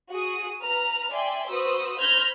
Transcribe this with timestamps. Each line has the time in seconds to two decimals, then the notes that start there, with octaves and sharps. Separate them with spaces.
0.11 F#4 G#4 D#6
0.62 B4 A#5 F6
1.12 D5 E5 G5 G#5 C6
1.48 F#4 B4 C5 D#6 E6
1.97 C5 B5 F6 G6 G#6 A#6